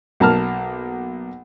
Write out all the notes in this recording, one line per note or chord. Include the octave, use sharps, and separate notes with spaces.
B1 A#3 A5 A#5 F6